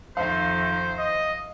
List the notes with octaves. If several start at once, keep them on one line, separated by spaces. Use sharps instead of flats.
F2 D#3 C5 E5 F5
D#5